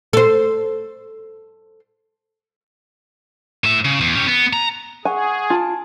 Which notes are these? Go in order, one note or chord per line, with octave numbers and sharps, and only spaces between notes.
A4 C5
A2 E5
C#3
E2
C#4 G4
B3
A#5
G#4 F#5 G#5 C#6 F#6
F4 G#5 A5